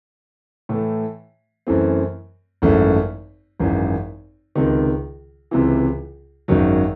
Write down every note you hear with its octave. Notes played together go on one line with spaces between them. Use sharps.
A2 E3 A3
F#2 E3 A3 C4
G#1 F#2 E3 A3
G#1 F#2 E3
C#2 C3 D#3
C#2 C3 E3
G#1 F#2 D#3 F#3